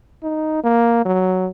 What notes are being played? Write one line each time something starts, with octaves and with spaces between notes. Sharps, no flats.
D#4
A#3
F#3